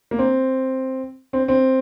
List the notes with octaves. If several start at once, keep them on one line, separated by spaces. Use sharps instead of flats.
A#3
C4
C4
C4